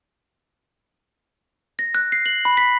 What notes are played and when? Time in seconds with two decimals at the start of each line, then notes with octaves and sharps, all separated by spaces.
1.79 A#6
1.95 F#6
2.12 C7
2.26 F#7
2.45 B5
2.57 B6